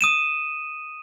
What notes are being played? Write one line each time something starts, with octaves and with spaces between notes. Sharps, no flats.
D#6 D#7 E7